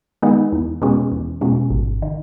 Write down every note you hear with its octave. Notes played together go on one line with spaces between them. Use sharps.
D#3 G#3 B3 D#4
E2
B2 G#3 C#4
E2
B2 G#3 C#4
G#1
D#3